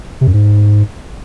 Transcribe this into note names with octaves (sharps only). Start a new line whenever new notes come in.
C3
F#2
G#2